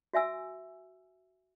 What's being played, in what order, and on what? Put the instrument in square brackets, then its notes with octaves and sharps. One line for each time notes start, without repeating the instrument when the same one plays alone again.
[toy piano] F#4 E5 G#5 E6